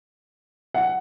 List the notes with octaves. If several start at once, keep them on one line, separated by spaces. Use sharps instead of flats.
F#5